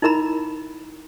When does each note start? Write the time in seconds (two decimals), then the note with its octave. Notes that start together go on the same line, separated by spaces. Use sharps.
0.02 D#4 E4 A#4 A#5 B5